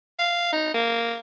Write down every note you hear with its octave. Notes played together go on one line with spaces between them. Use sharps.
F5
D#4
A#3